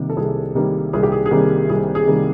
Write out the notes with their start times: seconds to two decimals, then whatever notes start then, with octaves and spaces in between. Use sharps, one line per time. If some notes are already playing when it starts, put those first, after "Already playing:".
Already playing: C3 D#3 G3 A#3
0.10 A4
0.17 C2 G#4
0.55 C3 D#3 G3 A#3
0.93 C2 G#4
1.03 G4
1.12 G#4
1.26 G#4
1.31 C3 D#3 G3 A#3 G4
1.69 C2 G#4
1.95 G#4
2.07 C3 D#3 G3 A#3